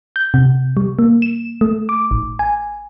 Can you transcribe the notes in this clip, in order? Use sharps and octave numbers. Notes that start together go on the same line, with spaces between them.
G6
C3
G3
A#3
E7
A3
D6
A1
G#5